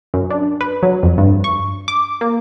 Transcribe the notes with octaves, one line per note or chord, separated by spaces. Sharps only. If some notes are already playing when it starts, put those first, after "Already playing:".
F#2
D4
B4
F#3
F2
G2
C#6
D6
A#3